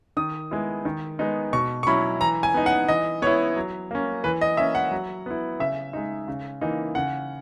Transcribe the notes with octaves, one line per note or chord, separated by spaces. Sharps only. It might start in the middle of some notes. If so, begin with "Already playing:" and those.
D#3 D#6
G#3 B3 E4
D#3
G#3 B3 D#4
B2 C#6
C#6
F#3 C#4 E4 B5
E3 A#5
G#5
B3 D#4
F#5
E3 D#5
B3 E4 C#5
F#3
A#3 C#4
E3 B4
D#5
A#3 C#4 E5
F#5
F#3
B3 E4
C#3 E5
G#3 D#4
C#3
E3 A#3 D#4
C#3 F#5